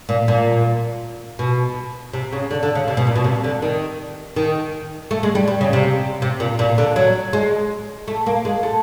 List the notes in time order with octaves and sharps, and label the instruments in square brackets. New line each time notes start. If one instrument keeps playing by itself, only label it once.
[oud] A#2
A#2
B2
C3
C#3
D3
D3
C#3
C3
B2
A#2
B2
C3
D3
D#3
D#3
A3
G#3
G3
G3
C#3
C3
C3
A#2
A#2
D3
F#3
G#3
A3
A#3
G#3
A3